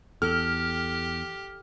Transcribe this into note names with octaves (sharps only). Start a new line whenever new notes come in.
E2 G4 A4 F6